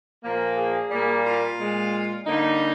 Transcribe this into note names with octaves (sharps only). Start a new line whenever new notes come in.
A#2 F3 A#3
G#4
A#2 G3 A#3
F4
A#2 G#3
D3 G3 A#3 D#4